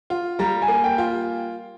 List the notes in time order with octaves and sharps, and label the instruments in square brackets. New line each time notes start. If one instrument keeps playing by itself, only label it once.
[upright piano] F4
[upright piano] G3 [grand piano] A#5
[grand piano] G#5
[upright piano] A#3
[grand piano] G5
[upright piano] F4